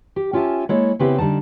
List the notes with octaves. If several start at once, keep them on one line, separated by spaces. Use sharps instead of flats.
G4
C#4 F4 G4 E5 G#5 A5
G#3 A#3 E4 A4 C#5
C#3 B3 C4 E4 G4 B4
D3 G3 D#4 A5